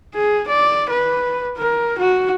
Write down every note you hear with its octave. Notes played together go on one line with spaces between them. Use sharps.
G#4
D5
B4
A#4
F#4